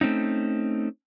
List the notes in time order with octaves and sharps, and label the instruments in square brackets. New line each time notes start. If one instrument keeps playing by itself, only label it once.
[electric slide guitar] A3 C4 C#4 D#4